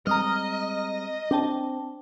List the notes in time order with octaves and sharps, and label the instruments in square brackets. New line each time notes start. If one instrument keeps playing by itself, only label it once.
[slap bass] G3 G#3 C4 [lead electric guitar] D#5 [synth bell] A#5 D#6 F6
[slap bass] C4 [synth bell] D4 G5 A5